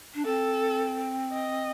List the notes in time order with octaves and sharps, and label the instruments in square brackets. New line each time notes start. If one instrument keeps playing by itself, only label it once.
[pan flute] D4
[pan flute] C4 [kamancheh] A4
[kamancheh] D#5